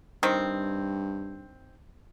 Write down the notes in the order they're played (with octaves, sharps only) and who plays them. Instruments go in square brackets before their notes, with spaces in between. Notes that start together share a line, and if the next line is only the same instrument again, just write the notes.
[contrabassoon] G2 [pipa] D#3 C4